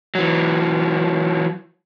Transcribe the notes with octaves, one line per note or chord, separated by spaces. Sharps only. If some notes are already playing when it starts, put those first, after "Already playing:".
E3 F#3